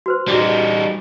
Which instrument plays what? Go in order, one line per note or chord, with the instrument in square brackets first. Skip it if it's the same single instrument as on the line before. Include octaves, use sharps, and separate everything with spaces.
[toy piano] F#4 B4 C5
[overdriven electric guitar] G3 D#4 [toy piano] F#4 G#4 D5